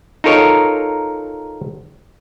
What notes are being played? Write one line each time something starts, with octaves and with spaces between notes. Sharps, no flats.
D#4 F4 A4 A#4 C#5 D#5